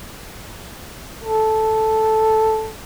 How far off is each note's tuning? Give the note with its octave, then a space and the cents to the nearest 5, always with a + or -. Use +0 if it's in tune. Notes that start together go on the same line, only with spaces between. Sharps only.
A4 -5